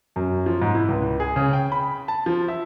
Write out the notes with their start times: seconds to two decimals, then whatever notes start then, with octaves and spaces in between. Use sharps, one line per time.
0.16 F#2
0.46 F3
0.62 G#2
0.75 E4
0.89 C#2
1.20 G#4
1.36 C#3
1.53 G5
1.72 B5
2.08 A5
2.26 F3
2.48 E5